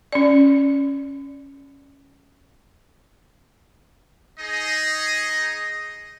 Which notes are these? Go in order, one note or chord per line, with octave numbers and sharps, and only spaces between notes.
C#4 D5
D#4 G#4 D#5